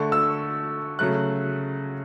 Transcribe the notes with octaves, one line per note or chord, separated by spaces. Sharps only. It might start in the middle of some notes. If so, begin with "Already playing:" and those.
Already playing: D3 A3 C#6
E6
C#3 F#3 A3 F#6